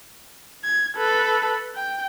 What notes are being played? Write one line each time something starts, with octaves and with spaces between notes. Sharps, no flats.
G#6
A4 B4
G5